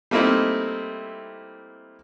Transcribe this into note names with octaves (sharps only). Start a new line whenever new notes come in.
G3 A3 A#3 C4 D#4 E4